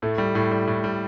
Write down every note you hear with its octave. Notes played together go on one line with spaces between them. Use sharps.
A2 A3
G3
A2
G3
A2
G3